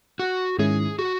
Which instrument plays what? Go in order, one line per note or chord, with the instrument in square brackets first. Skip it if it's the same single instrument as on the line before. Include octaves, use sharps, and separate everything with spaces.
[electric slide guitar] F#4
[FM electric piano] G#2 D#3 G#3 C#4 E4 [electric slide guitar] G#4
[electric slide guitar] F#4